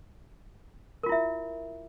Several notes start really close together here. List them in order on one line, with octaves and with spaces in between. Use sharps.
A#4 F4 E4 E5